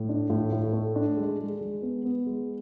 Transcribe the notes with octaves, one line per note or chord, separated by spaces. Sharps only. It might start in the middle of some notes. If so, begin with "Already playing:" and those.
Already playing: A2
D4
A2
A2
A3
D4
G#3
G#3
G#3
B3
B3
G#3